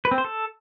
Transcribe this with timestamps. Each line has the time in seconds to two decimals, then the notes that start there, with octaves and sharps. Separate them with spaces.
0.05 B4
0.11 C4
0.18 C5
0.25 A4